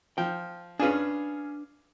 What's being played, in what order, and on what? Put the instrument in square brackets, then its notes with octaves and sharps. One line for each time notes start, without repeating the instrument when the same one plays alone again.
[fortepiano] F3 [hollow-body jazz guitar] G5
[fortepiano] C#4 F4 G#4 [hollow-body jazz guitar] D4 B4